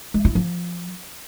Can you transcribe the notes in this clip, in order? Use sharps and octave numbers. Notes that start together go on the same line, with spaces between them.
G#3
E4
F3